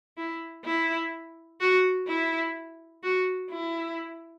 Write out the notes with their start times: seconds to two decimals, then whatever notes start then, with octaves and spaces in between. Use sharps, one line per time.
0.17 E4
0.65 E4
1.61 F#4
2.08 E4
3.04 F#4
3.51 E4